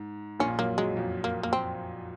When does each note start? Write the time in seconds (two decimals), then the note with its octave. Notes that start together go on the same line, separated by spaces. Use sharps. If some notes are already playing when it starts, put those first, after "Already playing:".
Already playing: G#2
0.40 A#1 A#2 C#4
0.59 F#2 F#3 A#3
0.77 F#2 F#3 G#3
0.96 F2 F3
1.24 A#3
1.43 A#3
1.53 C4